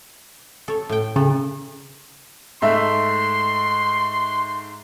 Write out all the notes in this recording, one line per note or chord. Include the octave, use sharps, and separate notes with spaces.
A4 C#5
A2 G5
C#3 A4
G#2 A3 E5 C6